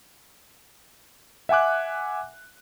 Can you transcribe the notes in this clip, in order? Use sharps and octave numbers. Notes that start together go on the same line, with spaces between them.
E5 F#5 G#5 D6 F#6